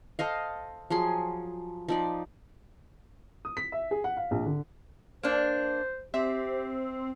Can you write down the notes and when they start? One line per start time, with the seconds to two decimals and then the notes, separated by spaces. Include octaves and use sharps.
0.19 A4 C5 D#5 F5
0.90 F3 F#3 G#4 C6
1.88 F3 D#4 D5
3.45 D#6
3.57 B6
3.72 E5
3.91 G#4
4.04 F#5
4.17 F5
4.31 A#1
4.46 D3
5.23 A#3 D4 C5
6.14 C4 G4 E5